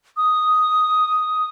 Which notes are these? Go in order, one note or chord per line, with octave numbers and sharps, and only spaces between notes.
D#6